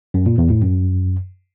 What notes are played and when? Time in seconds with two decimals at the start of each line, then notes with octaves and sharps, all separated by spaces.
0.14 F#2
0.26 A#2
0.38 E2
0.50 A2
0.62 F#2